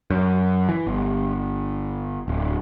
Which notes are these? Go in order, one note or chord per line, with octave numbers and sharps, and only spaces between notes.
F#2
E3
G1
D1